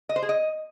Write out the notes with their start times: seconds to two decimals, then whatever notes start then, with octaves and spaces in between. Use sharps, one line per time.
0.09 D#5
0.16 C5
0.22 G#4
0.29 D#5